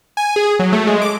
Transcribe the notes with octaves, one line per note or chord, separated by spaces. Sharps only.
G#5
G#4
F#3
A3
G#3
D6